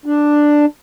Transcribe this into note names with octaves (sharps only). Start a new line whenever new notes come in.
D4